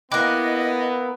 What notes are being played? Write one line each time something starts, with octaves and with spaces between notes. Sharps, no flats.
A#3 B3 E4 D#5 G5 D6 F#6